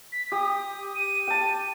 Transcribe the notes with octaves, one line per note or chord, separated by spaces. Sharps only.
B6
G4 D#6
D#7
G5 A5